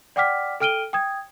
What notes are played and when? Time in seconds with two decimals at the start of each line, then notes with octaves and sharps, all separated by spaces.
0.16 D5 F#5 G5 D6 F6 B6
0.60 A4 G5 F6 D7 D#7 G7
0.93 G5 D#6 G#6